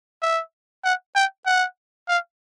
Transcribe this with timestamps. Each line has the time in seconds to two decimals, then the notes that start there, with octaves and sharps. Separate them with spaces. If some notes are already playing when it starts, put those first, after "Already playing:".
0.22 E5
0.84 F#5
1.16 G5
1.46 F#5
2.08 F5